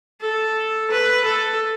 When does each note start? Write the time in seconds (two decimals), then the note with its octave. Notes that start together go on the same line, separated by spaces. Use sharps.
0.21 A4
0.91 B4
1.25 A4